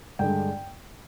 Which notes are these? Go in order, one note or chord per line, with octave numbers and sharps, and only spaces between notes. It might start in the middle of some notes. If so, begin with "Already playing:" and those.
G2 D3 G#3 D4 G5